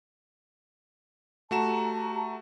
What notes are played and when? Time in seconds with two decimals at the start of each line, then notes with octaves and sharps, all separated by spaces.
1.51 A3 F#4 G4 A5 A#5 E7